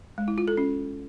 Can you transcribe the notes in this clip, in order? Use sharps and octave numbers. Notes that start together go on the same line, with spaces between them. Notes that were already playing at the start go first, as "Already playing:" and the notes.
G#3
E4
F4
A4
C#4